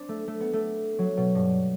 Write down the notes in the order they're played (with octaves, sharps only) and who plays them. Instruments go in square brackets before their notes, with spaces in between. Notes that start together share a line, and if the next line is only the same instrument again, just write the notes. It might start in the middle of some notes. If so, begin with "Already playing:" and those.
Already playing: [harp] C4 D4
A3
A3
B3
A3
F#3
B2
G2